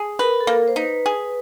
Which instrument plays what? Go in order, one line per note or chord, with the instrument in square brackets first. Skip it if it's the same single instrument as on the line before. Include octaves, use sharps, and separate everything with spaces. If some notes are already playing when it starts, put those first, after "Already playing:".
Already playing: [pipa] G#4
[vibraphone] A#4 [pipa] B4
[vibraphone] A4
[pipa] A#3 [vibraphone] A#4
[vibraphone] C5
[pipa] D#4 [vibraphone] B4
[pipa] G#4